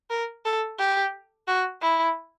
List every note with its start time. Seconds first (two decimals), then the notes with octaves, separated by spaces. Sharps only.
0.10 A#4
0.45 A4
0.79 G4
1.47 F#4
1.82 E4